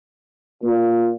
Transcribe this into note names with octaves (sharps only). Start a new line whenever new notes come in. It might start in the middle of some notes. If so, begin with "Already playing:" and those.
A#2 A#3